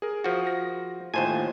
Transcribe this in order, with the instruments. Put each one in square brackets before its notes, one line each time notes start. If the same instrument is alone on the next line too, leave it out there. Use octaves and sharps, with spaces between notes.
[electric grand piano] G#4 A#4
[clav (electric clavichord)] F3 F#4
[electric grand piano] A#6
[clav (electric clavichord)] D#2 C5 G#5 [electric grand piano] A2 F4 A5